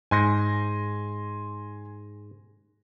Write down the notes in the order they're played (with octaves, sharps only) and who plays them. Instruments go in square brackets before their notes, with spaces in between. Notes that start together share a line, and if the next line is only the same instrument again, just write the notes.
[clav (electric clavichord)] G#2 [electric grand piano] G#5 C6 A#6